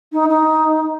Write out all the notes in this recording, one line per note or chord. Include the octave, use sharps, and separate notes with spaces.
D#4
D#4